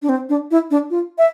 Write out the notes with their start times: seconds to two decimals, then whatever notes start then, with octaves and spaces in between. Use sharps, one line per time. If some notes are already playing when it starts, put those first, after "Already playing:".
0.02 D4
0.09 C4
0.29 D4
0.51 E4
0.71 D4
0.90 F4
1.18 E5